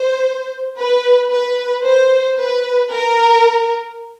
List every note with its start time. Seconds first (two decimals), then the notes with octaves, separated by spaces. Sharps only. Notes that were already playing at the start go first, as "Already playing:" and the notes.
Already playing: C5
0.78 B4
1.32 B4
1.85 C5
2.39 B4
2.92 A#4